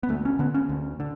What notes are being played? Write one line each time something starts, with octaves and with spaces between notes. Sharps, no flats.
B3
D2 A3
C#4
D3 B3
C#4
D2
D3